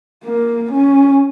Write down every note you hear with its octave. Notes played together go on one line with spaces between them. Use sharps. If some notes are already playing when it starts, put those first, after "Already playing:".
A#3
C#4